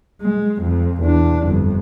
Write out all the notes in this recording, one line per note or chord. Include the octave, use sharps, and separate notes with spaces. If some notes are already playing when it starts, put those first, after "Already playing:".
G#3
F2
E2 D4
G1 F2